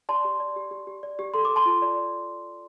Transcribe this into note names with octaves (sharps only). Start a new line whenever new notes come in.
D5 A5 C6
G4
D5
G4
G4
G4
D5
G4
A4 C6
D6
A4
A5 C6
F4
D5